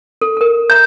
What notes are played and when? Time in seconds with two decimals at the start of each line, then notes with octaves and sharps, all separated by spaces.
0.22 A4
0.37 A4 A#4
0.70 E5 A#5 G6